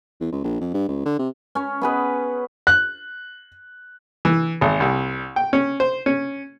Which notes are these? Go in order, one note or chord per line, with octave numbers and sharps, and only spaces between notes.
E2
C#2
A#1
F2
G2
C#2
D3
C3
C#4 C#5
B3 G#4 B4
F#6
E3
G#1
C2
G5
C#4
C5
C#4